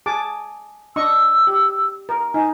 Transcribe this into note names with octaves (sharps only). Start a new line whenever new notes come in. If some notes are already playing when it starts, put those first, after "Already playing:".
G#4 A5 D6
D4 D#5 C#6 E6
G4
A#4
D#4 G#5